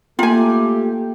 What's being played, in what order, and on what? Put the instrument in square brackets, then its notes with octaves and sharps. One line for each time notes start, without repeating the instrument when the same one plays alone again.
[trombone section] A3 [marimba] A#3 A#5 [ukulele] F4 G#5 [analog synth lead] G4